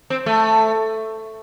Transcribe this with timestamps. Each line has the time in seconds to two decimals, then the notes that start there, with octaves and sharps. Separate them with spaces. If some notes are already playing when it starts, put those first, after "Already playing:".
0.10 C4
0.26 A3